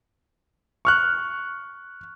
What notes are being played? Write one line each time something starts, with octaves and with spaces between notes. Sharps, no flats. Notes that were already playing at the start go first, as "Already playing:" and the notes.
C#6 F6 F#6